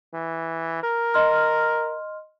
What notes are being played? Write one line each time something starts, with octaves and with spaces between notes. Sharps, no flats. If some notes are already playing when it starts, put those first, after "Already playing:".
E3
A#4
D#5 C6 F6